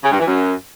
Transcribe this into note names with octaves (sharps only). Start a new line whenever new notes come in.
C#3
G2
E3
F#2